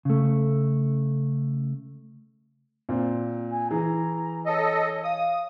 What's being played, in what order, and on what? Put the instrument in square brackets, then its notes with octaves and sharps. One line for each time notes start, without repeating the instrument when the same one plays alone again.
[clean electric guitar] C#3 A3
[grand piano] A#2 C4
[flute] G#5
[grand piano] E3 G#4 [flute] A#5
[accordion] A4 D#5 [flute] C#5
[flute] F5 [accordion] D#6
[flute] F5